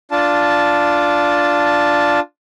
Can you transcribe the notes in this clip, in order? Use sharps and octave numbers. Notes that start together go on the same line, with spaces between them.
D4 F4 A5